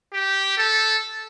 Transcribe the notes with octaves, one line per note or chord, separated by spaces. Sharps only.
G4
A4